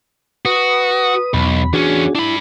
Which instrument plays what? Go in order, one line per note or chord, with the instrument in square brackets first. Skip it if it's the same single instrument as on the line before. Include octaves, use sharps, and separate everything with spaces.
[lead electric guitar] F#4 [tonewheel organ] B4 D#6
[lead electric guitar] B1 [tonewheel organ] E2 B5
[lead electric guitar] E2 C#4 [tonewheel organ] D4 F#4 G#4
[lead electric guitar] D4 B5 [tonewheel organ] E4